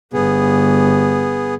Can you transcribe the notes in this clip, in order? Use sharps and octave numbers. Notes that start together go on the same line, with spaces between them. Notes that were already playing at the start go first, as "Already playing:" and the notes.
G1 B3 G#4